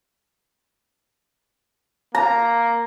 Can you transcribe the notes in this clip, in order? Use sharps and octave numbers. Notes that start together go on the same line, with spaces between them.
A#3 A#5